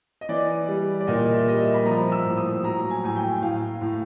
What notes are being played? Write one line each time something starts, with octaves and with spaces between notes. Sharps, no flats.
D#5
E3 D5
G3
D5
A#2 D#5
E5
G3 D#5
E5
B5
F3 A#5
E6
A2
D#6
F#3 A#5
G#5
A2 G#5
G5
A2 F5
A2